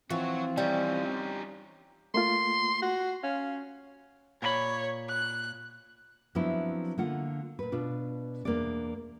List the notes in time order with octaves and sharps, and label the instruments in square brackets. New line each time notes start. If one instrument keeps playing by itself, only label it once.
[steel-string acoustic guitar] E3 F3 F4 [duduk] C4 [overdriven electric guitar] F#4 C#5
[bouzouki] G3 [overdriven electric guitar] C#4 D#4
[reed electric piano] A3 A#3 F4 [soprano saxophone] C6
[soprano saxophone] F#4
[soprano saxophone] C#4 [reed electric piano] F5
[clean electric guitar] A#2 A#4 B5 [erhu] C#5
[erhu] F#6
[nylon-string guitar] F3 F#3 B3 C4 D4 E4
D3 A#3 F4 F#5
A#2 B4
B2 D4 F4
E2 G2 A#3 B3 D4 D5